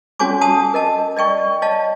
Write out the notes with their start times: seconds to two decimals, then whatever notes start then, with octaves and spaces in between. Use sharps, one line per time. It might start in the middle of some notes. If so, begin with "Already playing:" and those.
0.20 C#4 F#4 C#5 G#5 D6
0.41 F#5 G#5 A5 D#6
0.74 A#4 D#5 A5
1.16 D5 D#5 G5 C#6
1.62 C#5 D#5 F5 A5